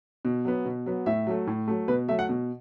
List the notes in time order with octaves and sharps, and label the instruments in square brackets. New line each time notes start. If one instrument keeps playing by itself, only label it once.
[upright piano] B2
F#3 B3
B2
F#3 B3
A2 E5
F#3 A3
A2
F#3 A3
B2 B4
F#3 A3 E5
F#5
B2